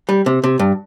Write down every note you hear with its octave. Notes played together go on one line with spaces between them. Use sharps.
G3
C3
C3
G2